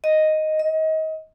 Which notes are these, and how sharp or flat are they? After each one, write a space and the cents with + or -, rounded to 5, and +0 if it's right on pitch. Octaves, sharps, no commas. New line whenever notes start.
D#5 +0
D#5 +25